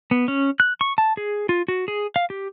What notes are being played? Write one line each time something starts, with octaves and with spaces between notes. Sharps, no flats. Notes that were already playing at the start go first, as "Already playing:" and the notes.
B3
C#4
F#6
C#6
A5
G#4
F4
F#4
G#4
F5
G4